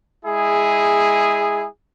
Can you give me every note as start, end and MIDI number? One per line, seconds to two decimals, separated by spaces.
0.24 1.65 56
0.24 1.65 64
0.24 1.65 68